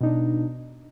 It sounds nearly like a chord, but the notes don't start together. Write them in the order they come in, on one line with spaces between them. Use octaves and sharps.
B2 D#4 D4